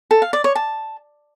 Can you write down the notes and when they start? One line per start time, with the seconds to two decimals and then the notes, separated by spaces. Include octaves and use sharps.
0.11 A4
0.22 F5
0.33 D5
0.44 C#5
0.55 A5